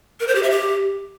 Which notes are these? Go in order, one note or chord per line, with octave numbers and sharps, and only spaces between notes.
A#4
C5
G4
E5
G4